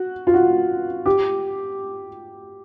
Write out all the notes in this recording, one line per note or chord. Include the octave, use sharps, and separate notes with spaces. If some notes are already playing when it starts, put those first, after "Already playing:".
Already playing: F#4
F4
F#4
G4